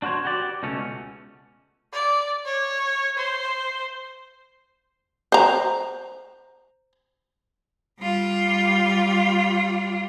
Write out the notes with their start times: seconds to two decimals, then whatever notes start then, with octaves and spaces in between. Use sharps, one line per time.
0.02 D4 F#4 A#4 C5 C#5
0.25 F#4 G4 B4 D5
0.63 C#2 B2 A3 C#4
1.93 D5
2.45 C#5
3.17 C5
5.32 C5 A#5
8.00 G3 F4